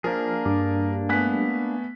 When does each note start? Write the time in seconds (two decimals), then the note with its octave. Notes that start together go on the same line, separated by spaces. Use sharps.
0.04 F3 A#3 D4 G#4 A#4
0.45 G2 D6
1.09 A3 B3 G#5 F#6 B6